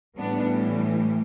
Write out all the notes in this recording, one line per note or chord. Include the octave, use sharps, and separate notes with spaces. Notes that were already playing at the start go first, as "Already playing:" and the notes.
A2 E3 G3 B3 D4